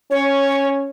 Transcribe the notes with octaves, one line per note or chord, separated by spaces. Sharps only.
C#4 C#5